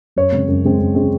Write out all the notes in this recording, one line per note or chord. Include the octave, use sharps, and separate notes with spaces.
F#2 C#5
C#3 G#3 C4
F#2
C#3 G#3 C4
F#2
C#3 G#3 C4